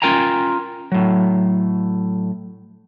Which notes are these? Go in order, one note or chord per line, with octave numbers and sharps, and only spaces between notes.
C#4 F4 A#4 G5 G#5 A#5
A2 F#3